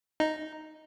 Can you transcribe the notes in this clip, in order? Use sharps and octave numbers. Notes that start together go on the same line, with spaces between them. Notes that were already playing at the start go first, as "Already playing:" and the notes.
D#4